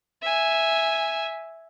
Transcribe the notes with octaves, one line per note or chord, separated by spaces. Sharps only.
E5 G#5